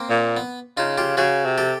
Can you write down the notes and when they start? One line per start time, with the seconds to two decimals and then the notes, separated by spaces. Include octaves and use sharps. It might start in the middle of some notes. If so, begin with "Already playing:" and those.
Already playing: A#3 C4
0.10 A#2
0.37 B3
0.77 C#3 D#4 F4
0.97 F4 G4
1.17 C#3 F#4 G#4
1.45 C3
1.58 G4 A4